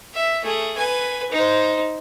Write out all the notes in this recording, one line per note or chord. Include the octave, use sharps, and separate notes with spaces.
E5
A3 G#4
B4 G#5
D#4 C5